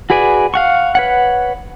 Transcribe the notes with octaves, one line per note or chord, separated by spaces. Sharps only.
F#4 G#4 B4 D5 G#5
F5 F#5 C#6
B4 C#5 F#5